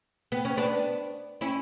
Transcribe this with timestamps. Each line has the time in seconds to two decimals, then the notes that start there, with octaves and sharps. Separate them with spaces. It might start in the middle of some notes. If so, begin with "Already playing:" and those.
0.32 B3
0.45 C#4
0.57 B3 D4
1.41 C#4 E4